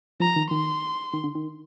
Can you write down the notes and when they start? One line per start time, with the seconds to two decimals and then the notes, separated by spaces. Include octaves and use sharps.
0.20 F3 A#5
0.36 D#3
0.51 D#3 C6
1.14 D#3
1.24 D3
1.35 D#3